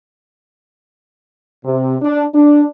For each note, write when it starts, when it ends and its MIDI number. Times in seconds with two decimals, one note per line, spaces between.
1.65 1.96 48
2.02 2.24 62
2.34 2.64 62